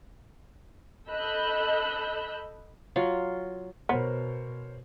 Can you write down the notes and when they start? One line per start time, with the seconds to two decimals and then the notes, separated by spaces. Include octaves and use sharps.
1.09 A4 D#5 B5 E6 F#6 G6
2.96 F#3 F4
3.89 B2 B3 A#4 C5 C#5